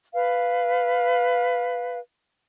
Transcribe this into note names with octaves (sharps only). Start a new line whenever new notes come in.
B4 F5